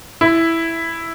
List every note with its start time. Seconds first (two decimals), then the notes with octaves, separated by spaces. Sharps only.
0.21 E4